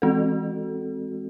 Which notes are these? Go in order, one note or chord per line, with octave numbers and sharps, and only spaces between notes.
E3 G#3 C4 F#4 A4